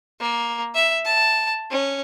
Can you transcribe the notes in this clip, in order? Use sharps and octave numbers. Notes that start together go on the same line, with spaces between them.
A#3
E5
A5
C#4